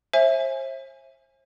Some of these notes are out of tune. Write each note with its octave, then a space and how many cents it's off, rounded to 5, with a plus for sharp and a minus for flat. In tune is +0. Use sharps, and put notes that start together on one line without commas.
C5 +40 E5 +0 G#5 +0